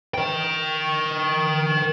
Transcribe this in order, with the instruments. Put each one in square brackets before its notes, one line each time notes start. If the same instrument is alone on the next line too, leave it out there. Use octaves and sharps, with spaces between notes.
[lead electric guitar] A#4 G5